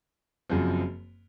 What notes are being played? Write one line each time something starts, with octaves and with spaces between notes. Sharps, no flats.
F#1 F#2 F3 C4